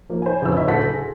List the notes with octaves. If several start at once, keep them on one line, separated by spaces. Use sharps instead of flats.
F3 A#3
C5 G#5
G1 F2 C#3 E6
C#5 D#5 E5
F#1 D2 A4 F#5 A#6 B6
G#4